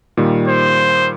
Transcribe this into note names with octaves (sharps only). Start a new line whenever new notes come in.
A#2 D#3 G3
C5